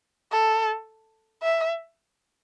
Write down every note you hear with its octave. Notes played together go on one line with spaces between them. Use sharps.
A4
E5